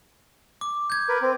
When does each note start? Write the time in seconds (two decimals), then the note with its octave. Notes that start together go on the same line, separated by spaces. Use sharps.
0.61 D6
0.90 G6 G#6
1.09 A#4 B4
1.22 C4